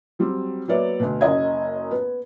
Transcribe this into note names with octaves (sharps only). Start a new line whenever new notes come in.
F#3 G3 C4
F#3 A#3 B3 C#5 D5 E5
D2 B2
F#1 F#2 D#5 G#6
B3